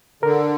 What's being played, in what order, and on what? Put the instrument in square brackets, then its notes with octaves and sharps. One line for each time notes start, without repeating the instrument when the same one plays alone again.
[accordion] D3 [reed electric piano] A#4